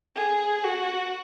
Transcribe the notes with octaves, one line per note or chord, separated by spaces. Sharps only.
G#4
F#4